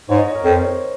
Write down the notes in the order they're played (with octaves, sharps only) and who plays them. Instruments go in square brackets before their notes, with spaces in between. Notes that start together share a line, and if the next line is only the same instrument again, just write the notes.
[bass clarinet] G#2 [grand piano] C#5
[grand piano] D#5
C#5
A#4
[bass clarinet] F2 [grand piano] C5
[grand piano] C#5